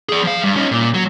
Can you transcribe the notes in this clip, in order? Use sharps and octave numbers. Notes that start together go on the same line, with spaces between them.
G#4 D5
F3 F5
G2
C#4 D#4
A#2
F#3